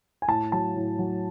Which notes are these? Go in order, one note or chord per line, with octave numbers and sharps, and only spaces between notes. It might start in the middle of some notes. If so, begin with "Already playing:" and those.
G#5
A2 A5
F#3 A5
A2
F#3